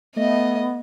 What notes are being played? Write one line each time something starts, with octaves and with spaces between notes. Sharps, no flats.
A3 B3 D#5